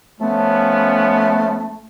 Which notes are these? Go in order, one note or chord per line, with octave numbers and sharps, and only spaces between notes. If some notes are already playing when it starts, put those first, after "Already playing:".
F3 A3 B3 C#4